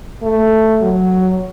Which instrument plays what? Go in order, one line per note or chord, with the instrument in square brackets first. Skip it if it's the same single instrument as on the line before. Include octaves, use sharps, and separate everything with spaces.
[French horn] A3
F#3